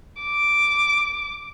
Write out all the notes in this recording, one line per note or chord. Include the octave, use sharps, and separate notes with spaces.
D6